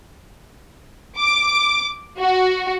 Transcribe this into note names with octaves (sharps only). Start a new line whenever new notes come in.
D6
F#4